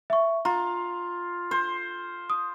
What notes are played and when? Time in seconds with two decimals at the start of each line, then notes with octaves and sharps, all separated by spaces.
0.10 E5 C#6
0.45 F4 A#5
1.51 C5
2.30 D#6